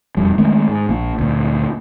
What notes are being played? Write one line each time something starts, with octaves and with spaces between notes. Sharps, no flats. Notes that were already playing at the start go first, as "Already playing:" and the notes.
E1 F2 G3
D#3 G#3 A3 C#4
G#2
A#1 A#3
D2 A#2